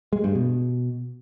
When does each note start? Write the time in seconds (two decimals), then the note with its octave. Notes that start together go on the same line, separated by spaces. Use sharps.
0.13 G#3
0.24 G2
0.35 B2